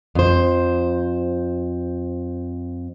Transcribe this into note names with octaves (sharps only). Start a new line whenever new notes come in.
F2 C5